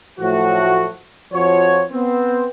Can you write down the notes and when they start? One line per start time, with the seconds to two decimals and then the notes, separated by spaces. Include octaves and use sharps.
0.20 A2 F3 F#3 A3 F#4
1.33 F2 F3 F4 F#4 C#5
1.92 B3 C4